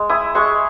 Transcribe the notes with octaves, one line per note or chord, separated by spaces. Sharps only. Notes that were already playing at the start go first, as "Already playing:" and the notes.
Already playing: G#3
E4 D#6
G#3 C#6